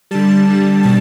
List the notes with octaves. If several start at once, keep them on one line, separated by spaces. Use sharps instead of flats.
D3 G3 A5
D3 G3
B2 G3 A5